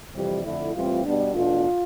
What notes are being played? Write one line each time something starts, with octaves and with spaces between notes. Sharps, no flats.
F2 C3 E3 G3
F2 D3 A3 E4
A2 E3 G3 C4 F4
B2 G3 B3 D4
E2 B2 A3 D4 F4